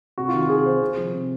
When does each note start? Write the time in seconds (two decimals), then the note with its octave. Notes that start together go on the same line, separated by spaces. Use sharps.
0.18 C3 F#4
0.28 F4
0.34 D#3
0.39 F#4
0.49 C3 G#4
0.66 D#3 C5
0.81 C3
0.97 F3
1.14 C3